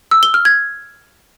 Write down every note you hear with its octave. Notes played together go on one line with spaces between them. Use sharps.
E6
G7
F6
G#6